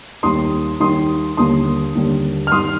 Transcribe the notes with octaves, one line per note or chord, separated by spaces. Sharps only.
D#2 D#3 G3 A#3 C6 D#6
D#2 D#3 G3 A#3 C6 D#6
D#2 D3 G3 A#3 C6 D#6
D#2 D3 G3 A#3
F6
G2 D#3 G3 C6 D#6